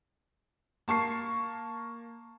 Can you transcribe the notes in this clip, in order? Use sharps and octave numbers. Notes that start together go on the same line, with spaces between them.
A#3 A5 C#6 C7